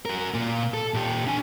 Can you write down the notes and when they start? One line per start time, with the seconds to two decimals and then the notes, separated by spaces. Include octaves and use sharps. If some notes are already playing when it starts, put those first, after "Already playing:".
0.05 F#4 A#4
0.34 A#2 A#3
0.74 A4
0.94 A#2 G4
1.27 D4 G#5